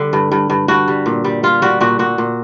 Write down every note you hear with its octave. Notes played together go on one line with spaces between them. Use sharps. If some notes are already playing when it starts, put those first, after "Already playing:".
Already playing: D3 G3
G2
G2
G2
G2 F#4
G3
A#2
G3
G3 F4
G3 F#4
A#2 F#4
A#2 F#4
A#2